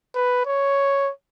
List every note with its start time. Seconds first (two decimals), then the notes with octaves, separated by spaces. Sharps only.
0.15 B4
0.46 C#5